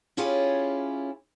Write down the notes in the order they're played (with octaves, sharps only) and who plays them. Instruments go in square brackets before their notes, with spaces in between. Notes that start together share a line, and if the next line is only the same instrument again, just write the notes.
[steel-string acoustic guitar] C#4 E4 F4 G4 G#4 C#5